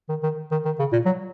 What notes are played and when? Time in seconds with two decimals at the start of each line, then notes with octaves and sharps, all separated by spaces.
0.09 D#3
0.23 D#3
0.51 D#3
0.65 D#3
0.79 C#3
0.92 A#2
1.05 F#3